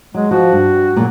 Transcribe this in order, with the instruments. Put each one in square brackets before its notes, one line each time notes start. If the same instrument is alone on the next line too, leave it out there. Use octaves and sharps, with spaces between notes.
[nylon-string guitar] F#3 [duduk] G#3
[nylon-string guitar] F3 [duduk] F#4
[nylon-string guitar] G2
A#2 F#3